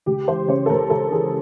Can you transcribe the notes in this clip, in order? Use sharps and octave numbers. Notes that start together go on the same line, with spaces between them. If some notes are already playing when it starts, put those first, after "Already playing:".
C#2 G4
E3 C5
C#3 C#5
A4
C#2 A#4
C#2 A4
E3 G#4